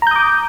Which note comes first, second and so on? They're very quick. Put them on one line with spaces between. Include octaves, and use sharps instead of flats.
A#5 G6 D#6 D6